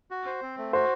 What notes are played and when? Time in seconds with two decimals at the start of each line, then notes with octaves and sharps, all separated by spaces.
0.11 F#4
0.26 C5
0.42 C4
0.58 A3
0.73 F#4 C5